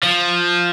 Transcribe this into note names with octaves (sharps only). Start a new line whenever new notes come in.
F3